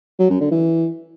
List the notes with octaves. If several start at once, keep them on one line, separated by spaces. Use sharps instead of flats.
F#3
F#2
D3
E3